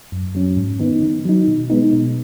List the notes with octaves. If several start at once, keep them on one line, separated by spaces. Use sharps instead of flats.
F#2
F#3 C#4
G#2
D#3 B3 D#4
D#3
F#3 D#4
B2
G#3 B3 D#4
B2